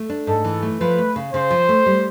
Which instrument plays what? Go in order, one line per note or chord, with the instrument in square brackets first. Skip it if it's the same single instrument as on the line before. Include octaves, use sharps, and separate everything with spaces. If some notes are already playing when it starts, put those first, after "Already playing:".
Already playing: [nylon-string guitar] A3
D4
[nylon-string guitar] G#2 [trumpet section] A4
[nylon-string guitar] E3
A3
[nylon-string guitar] F3 [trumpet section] B4
[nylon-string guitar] A3
C#3
[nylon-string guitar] C#3 [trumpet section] C5
[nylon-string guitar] F3
A3
G3